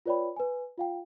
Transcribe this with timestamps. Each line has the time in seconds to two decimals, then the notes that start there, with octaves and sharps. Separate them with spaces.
0.06 F4 B4 C#5 D5 G5 B5
0.36 B4 G#5
0.78 F4 F5 G5